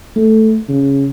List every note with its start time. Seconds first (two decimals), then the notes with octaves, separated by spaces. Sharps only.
0.16 A3
0.69 C#3